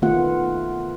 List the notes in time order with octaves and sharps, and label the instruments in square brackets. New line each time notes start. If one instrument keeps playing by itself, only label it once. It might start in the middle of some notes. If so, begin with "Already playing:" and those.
[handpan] D#3 A3 B3 F4 F#5